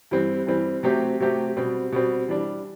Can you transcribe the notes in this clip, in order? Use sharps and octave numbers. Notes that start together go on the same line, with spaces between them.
G2 E3 G3 C4
G2 E3 G3 C4
C3 F#3 A3 C4 G4
C3 F#3 A3 C4 G4
B2 G3 C4
B2 G3 C4
E3 G3 D4